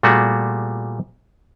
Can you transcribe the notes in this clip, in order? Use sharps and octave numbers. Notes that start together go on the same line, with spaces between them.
A#2 G3 A3 B3 F#4 G#4